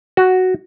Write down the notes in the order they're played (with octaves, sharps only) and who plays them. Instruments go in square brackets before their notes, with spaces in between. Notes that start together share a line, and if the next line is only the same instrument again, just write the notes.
[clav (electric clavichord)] F#4